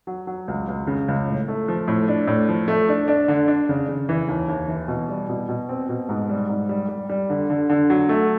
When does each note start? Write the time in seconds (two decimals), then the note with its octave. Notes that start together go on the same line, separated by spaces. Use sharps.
0.07 F#3
0.27 F#3
0.48 C#2
0.68 C#2
0.87 C#3
1.08 C#2
1.27 A2
1.48 A3
1.68 F3
1.88 A2
2.08 D4
2.28 A2
2.49 F3
2.68 A3
2.88 D4
3.08 D4
3.28 D3
3.48 D4
3.69 C#3
3.89 C#3
4.09 E3
4.28 D#2
4.48 D#2
4.68 E3
4.88 B2
5.09 G3
5.29 B2
5.49 B2
5.69 C4
5.89 B2
6.09 G#2
6.29 G3
6.49 G#2
6.69 G3
6.88 G3
7.09 G3
7.30 D3
7.50 D3
7.70 D3
7.90 F#3
8.09 A3